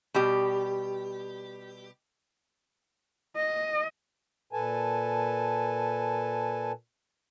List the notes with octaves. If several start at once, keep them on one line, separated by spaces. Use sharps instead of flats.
B2 G3 G4
D#5
A#2 A4 B4 G#5 A5